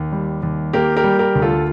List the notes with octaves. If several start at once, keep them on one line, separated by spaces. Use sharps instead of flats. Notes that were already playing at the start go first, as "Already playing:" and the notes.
Already playing: D#2
G3
D#2
A#3 G4 A#4
G4 A#4
G3
G4 A#4
D2
F4 A4